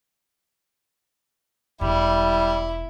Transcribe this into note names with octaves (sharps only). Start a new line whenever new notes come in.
E1 G3 E4